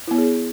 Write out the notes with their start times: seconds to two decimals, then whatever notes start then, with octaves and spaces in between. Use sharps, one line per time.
0.08 E4
0.11 B3
0.15 C#5
0.18 G#4